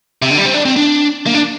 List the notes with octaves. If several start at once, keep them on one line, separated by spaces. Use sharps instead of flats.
C3
D3
G3
C4
D4
C4
D4
A#3
D4